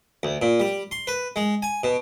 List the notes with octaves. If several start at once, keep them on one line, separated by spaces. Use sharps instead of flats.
D2
A#2
G3
C6
B4
G#3
G#5
B2